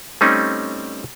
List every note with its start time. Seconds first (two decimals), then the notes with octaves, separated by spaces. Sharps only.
0.21 G3 A3 C4 C#4 D#4